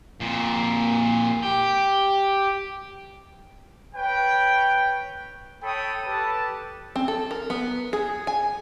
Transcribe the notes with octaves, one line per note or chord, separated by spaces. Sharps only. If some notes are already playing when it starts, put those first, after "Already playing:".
F2 A#2
G4
B4 C#5 G5
A4 C#5 G5 B5 D#6
G4 A4 B4 A5
C4
A4
A#4
B3
G#4
G#5